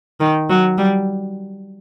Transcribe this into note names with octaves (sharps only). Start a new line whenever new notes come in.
D#3
F#3
G3